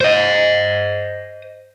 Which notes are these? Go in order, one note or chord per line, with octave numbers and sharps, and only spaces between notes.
C5 D#5